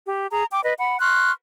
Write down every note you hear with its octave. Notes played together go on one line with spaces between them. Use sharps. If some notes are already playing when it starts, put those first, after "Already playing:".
G4
G#4 A#5
G5 D6
B4 D#5
F#5 B5
C6 C#6 F6 F#6